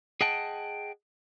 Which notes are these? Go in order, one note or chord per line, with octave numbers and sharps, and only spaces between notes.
G#4 D#5 F#5 G5 A5